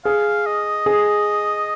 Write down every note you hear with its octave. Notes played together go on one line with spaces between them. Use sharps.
G#4 F5
D#5
G#4